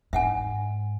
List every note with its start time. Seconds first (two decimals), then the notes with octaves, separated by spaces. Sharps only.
0.13 G#2 E5 F#5 G#5